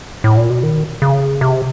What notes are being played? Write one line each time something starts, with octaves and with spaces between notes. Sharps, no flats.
A2
A#2
B2
D#3
C#3
C3